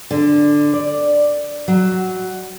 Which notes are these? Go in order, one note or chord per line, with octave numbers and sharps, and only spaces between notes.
D3
D5
F#3